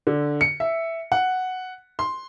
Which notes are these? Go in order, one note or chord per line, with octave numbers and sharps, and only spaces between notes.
D3
C#7
E5
F#5
C6